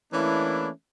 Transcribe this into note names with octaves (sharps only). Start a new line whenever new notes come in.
E3 A3 A#3 C#4 D4 E4